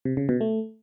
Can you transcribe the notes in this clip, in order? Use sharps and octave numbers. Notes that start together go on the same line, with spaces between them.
C3
C#3
B2
A3